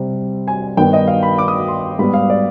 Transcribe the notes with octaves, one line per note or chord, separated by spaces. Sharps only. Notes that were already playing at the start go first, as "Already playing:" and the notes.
Already playing: C3 G3 C4
G#5
G2 D#3 B3 G5
D#5
F5
B5
D6
D#6
C6
G#2 G3 B3 B5
F5
D5